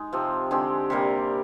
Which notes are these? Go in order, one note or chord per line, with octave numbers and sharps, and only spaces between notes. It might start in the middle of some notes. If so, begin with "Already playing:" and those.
Already playing: G#3 D#4
C3 F3 C4
D3 G#3 C4 G4
C3 G3 A#3